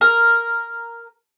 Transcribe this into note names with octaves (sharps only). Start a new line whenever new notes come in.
A#4